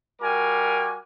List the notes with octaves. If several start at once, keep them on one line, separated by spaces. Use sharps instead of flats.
G3 F#4 A#4 G#5 D6